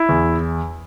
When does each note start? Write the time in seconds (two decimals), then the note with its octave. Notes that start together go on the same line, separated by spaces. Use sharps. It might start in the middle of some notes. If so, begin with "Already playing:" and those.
Already playing: E4
0.09 E2